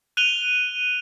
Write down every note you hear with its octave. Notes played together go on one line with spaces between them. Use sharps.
F#6 D#7 F7 G7